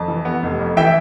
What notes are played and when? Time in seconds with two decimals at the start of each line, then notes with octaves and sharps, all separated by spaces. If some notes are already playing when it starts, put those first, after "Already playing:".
Already playing: F2 A5
0.08 E3
0.25 B3
0.43 F1
0.59 F2
0.77 E3 E5 G5